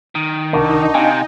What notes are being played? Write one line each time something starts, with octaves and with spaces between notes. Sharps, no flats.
D#3
C2 D4 D#4 F#4 A#4
C3 F5 G5 G#5